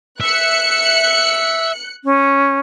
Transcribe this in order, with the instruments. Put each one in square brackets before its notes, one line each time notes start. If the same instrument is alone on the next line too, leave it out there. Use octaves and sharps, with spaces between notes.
[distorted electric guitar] E5 [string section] F#6 C#7
[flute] C#4